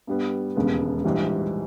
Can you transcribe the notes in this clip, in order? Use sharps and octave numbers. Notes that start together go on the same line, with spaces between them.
G2 G3 B3
E1 D#2 C#3 G#3 B3
A#1 G#2 E3 G3